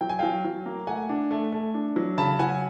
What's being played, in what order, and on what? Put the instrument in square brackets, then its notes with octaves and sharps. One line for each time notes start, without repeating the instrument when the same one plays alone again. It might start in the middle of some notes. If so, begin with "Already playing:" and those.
[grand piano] F#3 G5
G#5
F#3 F5 G5
F#3
A#3
A3 F#5 G#5
D4
A3
A3
D4
F#3
C#3 A5 B5
F#3 F#5 G#5